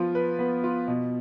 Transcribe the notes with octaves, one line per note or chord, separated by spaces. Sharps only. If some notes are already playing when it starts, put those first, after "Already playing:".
Already playing: F3 B3 F4
B4
B3
F4
B2